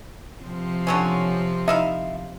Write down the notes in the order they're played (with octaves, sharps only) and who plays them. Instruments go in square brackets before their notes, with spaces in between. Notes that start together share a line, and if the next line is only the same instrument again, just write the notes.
[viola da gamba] C3 F3 C4
[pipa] D3 F#3 C#4
[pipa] D#4 E4 F5 [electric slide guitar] E5